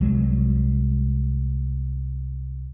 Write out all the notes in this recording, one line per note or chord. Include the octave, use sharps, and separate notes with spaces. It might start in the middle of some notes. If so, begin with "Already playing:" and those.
C2 F#3 G#3